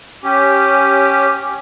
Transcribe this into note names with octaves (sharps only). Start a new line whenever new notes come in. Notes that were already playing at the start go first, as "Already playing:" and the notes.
C#4 G4